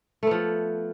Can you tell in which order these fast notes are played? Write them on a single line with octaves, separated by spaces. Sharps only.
A3 B3 F3